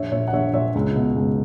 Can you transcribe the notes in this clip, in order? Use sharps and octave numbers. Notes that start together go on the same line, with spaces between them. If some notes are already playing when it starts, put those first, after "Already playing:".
Already playing: A#1 C#5 E5
A#2 C#5 E5
F#5
A#1 C#5 E5
A#2 C#5 E5
C#2
B2
C#2